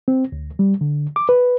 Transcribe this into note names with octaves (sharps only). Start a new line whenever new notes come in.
C4
D2
G3
D3
D6
B4